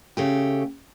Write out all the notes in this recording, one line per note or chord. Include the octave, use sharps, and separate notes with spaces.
C#3 A3 G4